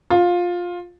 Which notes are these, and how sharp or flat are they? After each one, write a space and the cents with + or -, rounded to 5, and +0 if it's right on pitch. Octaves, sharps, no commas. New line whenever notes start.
F4 +15